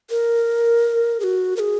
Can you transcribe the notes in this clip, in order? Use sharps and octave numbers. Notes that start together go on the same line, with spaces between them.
A#4
G#4
F#4
A#4
G#4